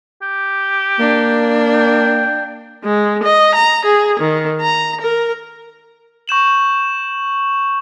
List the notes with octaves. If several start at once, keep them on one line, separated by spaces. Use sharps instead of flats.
G4
A#3 D4
G5
G#3
D#5
A#5
G#4
D#3
A#5
A#4
C#6 G6 E7 F#7